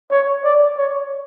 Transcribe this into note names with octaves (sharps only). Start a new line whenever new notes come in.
C#5
D5
C#5